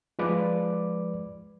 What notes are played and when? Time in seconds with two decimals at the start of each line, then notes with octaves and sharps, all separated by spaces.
0.19 F3 G#3 B4 D5 D6